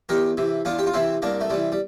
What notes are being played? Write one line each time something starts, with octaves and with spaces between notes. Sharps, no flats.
E2 G4 A#4
C3 E3
E2 D4 F4
G4
F4
C3 E3 C4 E4
C2 A#3 D4
A3
C3 E3 G3
G3